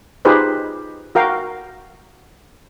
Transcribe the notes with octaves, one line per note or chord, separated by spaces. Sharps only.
D#4 F4 G4 G#4 B4 C5
F#4 A#4 F5 G5